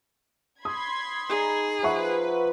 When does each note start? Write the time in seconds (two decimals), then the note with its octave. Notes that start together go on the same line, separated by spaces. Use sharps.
0.65 B5 C6 D#6 G#6
1.29 D#4 G#4 A#5
1.83 F3 B4 E5 F#5 C#6